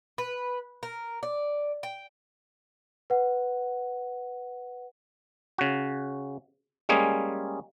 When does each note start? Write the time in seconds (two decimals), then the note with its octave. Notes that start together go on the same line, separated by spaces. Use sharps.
0.18 B4
0.83 A#4
1.23 D5
1.83 G5
3.10 B4 F#5
5.58 C#3 F#4
6.89 G3 G#3 A#3 C#4 G#4